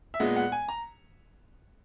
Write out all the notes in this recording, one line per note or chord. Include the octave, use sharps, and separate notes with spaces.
E5
A#2 G#3 B3 D#5
F#5
G#5
A#5